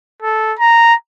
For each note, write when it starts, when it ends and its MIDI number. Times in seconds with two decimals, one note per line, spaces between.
0.22 0.54 69
0.59 0.94 82